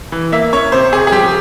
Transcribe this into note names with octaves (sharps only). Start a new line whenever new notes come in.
E3
A#3 E5
C#4 C#5
C3 C5
C3 G#4
G#4
F3 G4